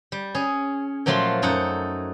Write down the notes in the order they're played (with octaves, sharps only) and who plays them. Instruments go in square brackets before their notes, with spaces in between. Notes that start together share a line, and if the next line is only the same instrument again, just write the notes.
[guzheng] G3
C#4 G#4
A#2 F3 F#3 A3 F4 C6
F#2 D#4 A4 F#5